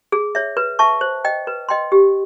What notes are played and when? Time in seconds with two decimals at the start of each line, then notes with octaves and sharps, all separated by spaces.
0.12 G#4
0.35 C#5 E5
0.57 B4
0.79 E5 A5 C#6
1.01 C5
1.25 D#5 G5
1.47 B4
1.69 D#5 G5 C6
1.92 G4